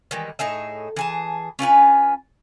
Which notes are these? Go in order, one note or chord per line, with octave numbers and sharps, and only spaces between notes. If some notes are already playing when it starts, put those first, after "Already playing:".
D#3 E3 G3 G#3
A2 D#4 G#4 E5
E3 G#4 A5
C#4 F4 B4 G#5